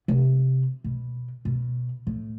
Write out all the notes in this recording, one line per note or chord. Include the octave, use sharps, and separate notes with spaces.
C3
B2
B2
A2